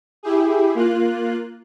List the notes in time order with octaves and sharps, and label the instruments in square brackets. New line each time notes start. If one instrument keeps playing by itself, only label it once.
[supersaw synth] E4 G4 G#4
A#3 F4 F#6